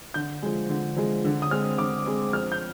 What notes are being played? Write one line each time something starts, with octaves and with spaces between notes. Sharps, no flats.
D3 G6
F3 G#3
D3
F3 G#3
D3
D#6
G#3 C4 F6
D3 D6
G#3 C4
F2 F6
G6